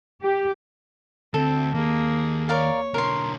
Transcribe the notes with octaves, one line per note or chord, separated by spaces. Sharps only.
G4
D2 C4 A4
D#2 A#3 G#4
A#4 C#5 D5 F5
B1 D3 A#4 C6